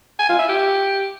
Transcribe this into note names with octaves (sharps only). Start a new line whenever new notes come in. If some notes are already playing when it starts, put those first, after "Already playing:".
G#5
F4
E5
G4